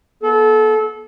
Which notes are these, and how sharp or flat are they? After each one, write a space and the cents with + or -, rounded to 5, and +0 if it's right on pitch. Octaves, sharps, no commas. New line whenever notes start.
B3 -35 A4 -25